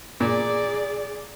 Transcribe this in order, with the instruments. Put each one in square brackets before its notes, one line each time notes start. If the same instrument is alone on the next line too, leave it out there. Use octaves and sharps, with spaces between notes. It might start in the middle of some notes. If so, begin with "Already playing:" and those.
[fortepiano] A#2 [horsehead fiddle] G#4 D5